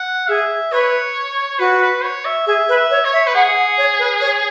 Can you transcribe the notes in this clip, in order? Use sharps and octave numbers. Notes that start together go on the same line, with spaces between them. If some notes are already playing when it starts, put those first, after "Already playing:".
Already playing: F#5
G#4 E5
B4 C#5
F#4 B4
B4
C#5
E5
G#4 E5
B4
E5
C#5
C#5
E5
B4
G#4 F#5
F#5
C#5
B4
C#5